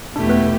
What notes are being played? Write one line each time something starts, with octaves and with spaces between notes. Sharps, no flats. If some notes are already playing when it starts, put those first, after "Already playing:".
E2 B2 A3 D4 E4 G4
B3 B4